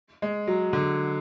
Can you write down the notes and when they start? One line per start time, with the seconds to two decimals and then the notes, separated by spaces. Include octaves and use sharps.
0.22 G#3
0.47 F#3
0.73 D3